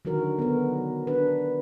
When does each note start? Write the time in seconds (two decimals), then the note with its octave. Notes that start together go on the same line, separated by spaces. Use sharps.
0.05 D3 D#3 F#3 F#4 A#4
0.39 B3 A#4
1.07 D4 B4